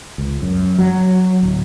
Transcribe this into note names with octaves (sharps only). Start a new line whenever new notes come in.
C#2
F#2
F#3
D1